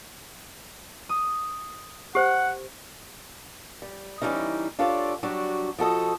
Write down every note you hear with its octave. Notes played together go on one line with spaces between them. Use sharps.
D#6
G4 C5 F#5
G3
E3 F#3 G3 C#4 D#4
D4 F4 G4 A4 C#5 D5
F#3 G3 D4 F#4
F3 F#4 A4 D#5